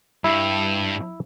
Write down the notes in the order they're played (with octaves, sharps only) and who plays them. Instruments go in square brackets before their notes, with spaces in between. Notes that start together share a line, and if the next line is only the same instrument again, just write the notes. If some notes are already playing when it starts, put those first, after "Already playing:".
[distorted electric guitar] G2 [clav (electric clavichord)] E4